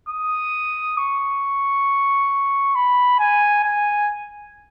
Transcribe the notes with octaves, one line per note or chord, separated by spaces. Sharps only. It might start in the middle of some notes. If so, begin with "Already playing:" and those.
D#6
C#6
B5
G#5
G#5